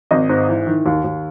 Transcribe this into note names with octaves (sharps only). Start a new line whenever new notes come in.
G#1 D#5
G#2
E3
D#3
D#2
D#2